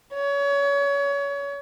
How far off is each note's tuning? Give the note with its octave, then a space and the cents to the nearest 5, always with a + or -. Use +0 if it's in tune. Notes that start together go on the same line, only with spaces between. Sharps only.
C#5 +30